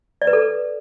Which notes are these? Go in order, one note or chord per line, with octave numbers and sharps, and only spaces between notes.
D5
B4
A4